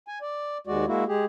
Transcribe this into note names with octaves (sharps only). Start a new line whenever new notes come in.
G#5
D5
D#2 G#3 F#4 D5
G#3 A#3 E4 F#4
G#3 G4 G#4